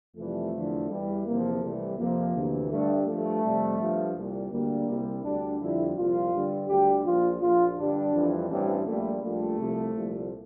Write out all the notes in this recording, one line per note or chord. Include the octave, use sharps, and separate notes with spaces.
F2 C3 E3 G3 A3
E2 D3 F3
E2 E3 G3
E2 C3 F3 A#3
C2 C3 E3 G3 A3
F2 C3 F3 A#3
D2 C3 E3
G2 D3 G3 A3
G2 F3 A3
F2 C3 G3
G2 F3
C2 A#2 G3
D2 D3 G3 A#3
C2 C3 G3
D2 D3 G3 D4
F2 D3 G3 E4
C2 A#2 F3 F4
G2 D3 G3
D2 D3 G3 G4
A#1 A#2 F3 F4
A#1 A#2 F3 F4
G2 D3 G3 D4
F2 E3 G3
A1 G2 E3 G3 C4
A#1 A#2 G3 A3
A#1 A#2 G3 A3
C2 C3 F3
C2 A#2 F3